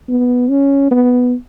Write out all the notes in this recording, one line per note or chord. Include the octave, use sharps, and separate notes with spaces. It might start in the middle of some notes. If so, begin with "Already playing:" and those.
B3
C#4
B3